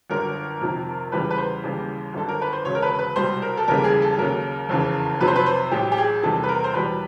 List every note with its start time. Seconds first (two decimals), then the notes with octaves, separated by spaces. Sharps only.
0.10 G1 F#2 D3 A#4
0.61 F2 C3 D#3
1.12 E2 C#3 E3 G3 B4
1.31 B4
1.38 C5
1.63 D#2 C#3 E3 G3
2.14 G1 F#2 D3 A4
2.28 A#4
2.42 B4
2.53 C5
2.65 E1 D2 C#3 C#5
2.75 A#4
2.82 B4
2.99 B4
3.16 C2 B2 G3 C5
3.42 A#4
3.57 A4
3.68 F1 D#2 C#3 E3 G3 A#4
3.84 G#4
4.02 A4
4.18 D#2 C#3 F#3 A#4
4.69 F1 E2 C#3 E3
5.20 F2 C3 D#3 F#3 B4
5.28 C5
5.36 B4
5.46 C5
5.71 A1 A2 F#3 G4
5.92 G4
5.98 G#4
6.23 E2 C3 D#3 G3 A4
6.44 B4
6.49 A#4
6.64 C5
6.73 E1 E2 B2 G3 B4